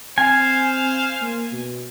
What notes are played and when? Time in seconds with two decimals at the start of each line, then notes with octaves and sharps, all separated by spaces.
0.18 C4 C5 F5 G#5
1.21 A#3
1.52 B2